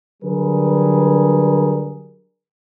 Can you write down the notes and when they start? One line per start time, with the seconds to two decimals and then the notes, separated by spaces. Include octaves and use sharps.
0.23 D3 F#3 G3 G#4 A#4 B4